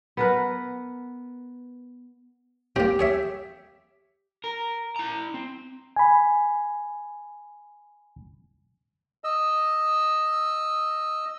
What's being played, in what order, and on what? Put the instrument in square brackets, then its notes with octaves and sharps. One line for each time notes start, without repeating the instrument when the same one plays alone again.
[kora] B3 A#4 B4
[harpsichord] A#3 C4 [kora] G4
[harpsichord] G#4 C#5 E5
[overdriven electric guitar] A#4
E4 A#5
C4
[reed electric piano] G#5 B5
[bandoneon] D#5 E6